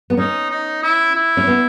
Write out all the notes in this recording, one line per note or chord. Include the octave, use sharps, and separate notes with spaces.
B3
C#4 D#4
D#4
E4
E4
C#4
B3